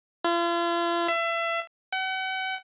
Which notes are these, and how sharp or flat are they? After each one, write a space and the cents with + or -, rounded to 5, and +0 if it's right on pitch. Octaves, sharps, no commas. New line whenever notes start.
F4 -40
E5 +30
F#5 +40